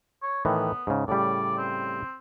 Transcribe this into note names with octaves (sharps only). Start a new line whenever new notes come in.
C#5
A2 D#3 E3 B3
G#2 C#3
A2 C#3 G3 D5
C4